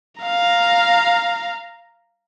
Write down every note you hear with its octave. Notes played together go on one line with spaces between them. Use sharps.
F5 A#5